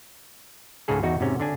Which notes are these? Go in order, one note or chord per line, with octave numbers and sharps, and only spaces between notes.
C#2 G#2 C#3 G#4 A4
E2 D#4 F#4
G#2 C3 C#4
D3 D4 G#5